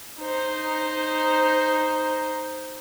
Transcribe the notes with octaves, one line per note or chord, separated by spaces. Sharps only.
D#4 C5